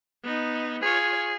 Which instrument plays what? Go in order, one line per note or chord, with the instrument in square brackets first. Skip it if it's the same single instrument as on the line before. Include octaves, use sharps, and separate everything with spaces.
[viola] B3 D#4
[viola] F4 C#5 [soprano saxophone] G#4